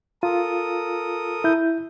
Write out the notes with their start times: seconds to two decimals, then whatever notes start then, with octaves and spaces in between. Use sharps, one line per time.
0.23 F4 A4 A#4 D#6
1.44 E4 G6